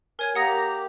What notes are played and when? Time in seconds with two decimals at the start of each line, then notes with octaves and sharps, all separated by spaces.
0.19 A#4 C#5 G#5 G#6
0.36 A#3 G4 F#5 A#5 D#6 A#6